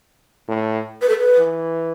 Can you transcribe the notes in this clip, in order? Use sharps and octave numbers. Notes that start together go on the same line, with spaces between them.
A2
B4
A4
B4
E3